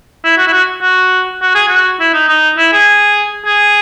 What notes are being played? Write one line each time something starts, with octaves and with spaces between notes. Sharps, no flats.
E4
F#4
E4
F#4
F#4
F#4
G#4
F#4
E4
D#4
D#4
E4
G#4
G#4